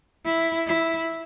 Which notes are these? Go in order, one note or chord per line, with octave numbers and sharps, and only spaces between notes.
E4
E4